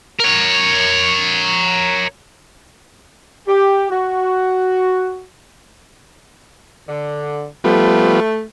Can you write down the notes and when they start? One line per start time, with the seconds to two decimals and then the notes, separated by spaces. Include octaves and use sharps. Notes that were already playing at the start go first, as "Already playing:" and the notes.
0.20 A#4 C#5
3.47 G4
3.90 F#4
6.88 D3
7.64 F3 G3 A3 B3